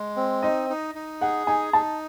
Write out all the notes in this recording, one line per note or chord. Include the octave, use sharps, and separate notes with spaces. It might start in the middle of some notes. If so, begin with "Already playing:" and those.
Already playing: G#3
C4
D#4 D#5
D#4
D#4
G#4 F#5
D#4 G#5
D#4 A5